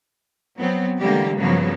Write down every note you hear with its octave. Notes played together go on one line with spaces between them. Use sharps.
F#3 B3 C4
D3 E3 G3 G#3 A#3 G4
G2 C#3 F3 F#3 A#3 B3